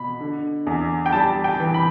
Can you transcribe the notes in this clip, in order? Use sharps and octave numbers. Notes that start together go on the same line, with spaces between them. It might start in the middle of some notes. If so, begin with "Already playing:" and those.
Already playing: B2 B5
D3
E2
G5
G3 A5
G5
E3
B5